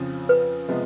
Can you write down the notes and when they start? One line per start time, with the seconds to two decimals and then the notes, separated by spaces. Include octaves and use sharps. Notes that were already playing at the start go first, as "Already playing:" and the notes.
Already playing: F2 C#3 F3
0.29 B4
0.68 C3 F3 G#3 B3